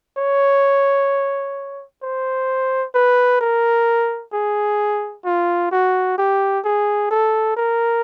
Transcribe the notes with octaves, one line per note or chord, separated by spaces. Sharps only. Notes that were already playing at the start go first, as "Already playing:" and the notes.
C#5
C5
B4
A#4
G#4
F4
F#4
G4
G#4
A4
A#4